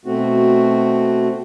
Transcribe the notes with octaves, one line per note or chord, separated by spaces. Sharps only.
B2 A3 C4 F#4